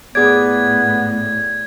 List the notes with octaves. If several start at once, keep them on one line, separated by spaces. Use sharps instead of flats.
A2 B3 G#4 D5 G#6